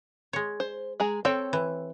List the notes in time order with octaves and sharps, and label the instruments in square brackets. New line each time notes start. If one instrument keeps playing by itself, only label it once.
[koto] G#3 C#5
[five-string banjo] C5
G#3 G#4 A#5
[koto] C4 [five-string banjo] A4 C#5 G5
[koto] E3